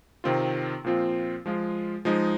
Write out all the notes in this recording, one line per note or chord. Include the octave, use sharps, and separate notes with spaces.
C3 D#3 C4 F4
A#2 F3 C4 F4
F3 G#3 F4
F3 G#3 D#4